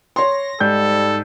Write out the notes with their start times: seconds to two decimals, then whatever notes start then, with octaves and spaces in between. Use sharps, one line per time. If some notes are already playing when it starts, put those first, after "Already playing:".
0.16 C#5 C6 A#6
0.60 G#2 G3 A4 G6